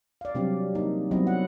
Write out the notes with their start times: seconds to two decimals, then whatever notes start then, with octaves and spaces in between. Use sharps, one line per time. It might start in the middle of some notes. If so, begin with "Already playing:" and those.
0.21 D5 F5
0.35 C3 F#3 G3 C4 D4 G4
0.75 A#3 D#4
1.11 F#3 G3 B3 C4 E4 D#5
1.27 F#5